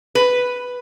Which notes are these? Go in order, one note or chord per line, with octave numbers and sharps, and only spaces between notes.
B4